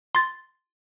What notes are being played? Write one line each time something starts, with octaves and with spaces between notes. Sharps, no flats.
C6 A6